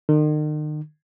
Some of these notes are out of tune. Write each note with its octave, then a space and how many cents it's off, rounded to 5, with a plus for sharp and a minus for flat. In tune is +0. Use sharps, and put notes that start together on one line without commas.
D#3 -40